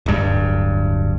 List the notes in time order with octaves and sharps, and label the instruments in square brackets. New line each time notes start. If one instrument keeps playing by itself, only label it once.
[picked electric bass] D1 G2